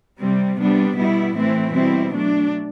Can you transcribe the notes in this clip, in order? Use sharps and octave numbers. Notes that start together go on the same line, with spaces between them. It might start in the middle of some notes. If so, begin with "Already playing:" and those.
C3 G3 C4
C3 G3 B3 D4
B2 G3 B3 E4
A2 E3 A3 C4 E4
B2 G3 C4 E4
F#3 A3 D4